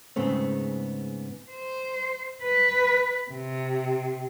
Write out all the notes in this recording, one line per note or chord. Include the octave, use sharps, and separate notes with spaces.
G#2 C#3 A3 B3 C4
C5
B4
C3